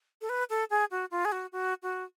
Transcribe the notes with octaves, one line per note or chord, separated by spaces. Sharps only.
A4
B4
A4
G#4
F#4
F4
G#4
F#4
F#4
F#4